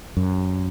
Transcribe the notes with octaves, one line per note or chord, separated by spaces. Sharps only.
F#2